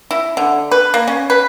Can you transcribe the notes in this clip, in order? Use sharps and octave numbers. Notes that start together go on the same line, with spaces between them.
E4
D3
B4
A#3
C#4
B4